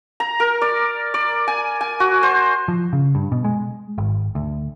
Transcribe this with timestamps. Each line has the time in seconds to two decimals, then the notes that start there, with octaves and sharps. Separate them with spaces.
0.20 A#5
0.40 A#4
0.62 D5
1.14 D5
1.48 G#5
1.81 G#5
2.00 F#4
2.23 C5
2.68 F3
2.93 C#3
3.15 G2
3.32 B2
3.44 G#3
3.98 G#1
4.35 D2